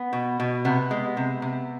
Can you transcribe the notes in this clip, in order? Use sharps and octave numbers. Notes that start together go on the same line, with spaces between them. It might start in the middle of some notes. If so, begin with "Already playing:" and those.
Already playing: B3
B2
B2
C3 B3
G#3
C3
C3